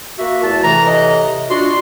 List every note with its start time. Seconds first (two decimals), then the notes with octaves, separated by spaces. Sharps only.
0.19 A#3 F#4 E5
0.43 E2 A3 A5
0.64 A2 C3 E3 A#5
0.87 D#5
1.50 D4 F4 F#4 C6